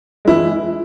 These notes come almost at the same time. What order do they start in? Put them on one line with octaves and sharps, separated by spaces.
G#3 E4 E3